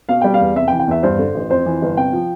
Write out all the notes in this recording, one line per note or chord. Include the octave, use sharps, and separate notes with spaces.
B2 F5
G3 G5
F5
E2
C3 E5
G5
E3
G5
E2 E5
G2 C5
D3
A1
F2 C5
E3
G1
C3 G5
F3